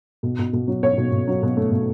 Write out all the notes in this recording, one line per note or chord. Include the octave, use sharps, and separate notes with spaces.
B2
B2
B2
F#3
B2 C#5
B2
B2
F#3
B2
A3
B2